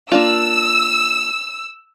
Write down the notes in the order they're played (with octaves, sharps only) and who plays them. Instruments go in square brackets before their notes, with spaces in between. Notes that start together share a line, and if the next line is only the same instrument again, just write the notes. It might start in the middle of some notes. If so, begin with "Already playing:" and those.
[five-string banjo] A#3 D4 F4 [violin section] E6